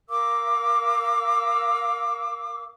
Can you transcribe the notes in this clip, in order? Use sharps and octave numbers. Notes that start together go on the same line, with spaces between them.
A#4 F5 D6 E6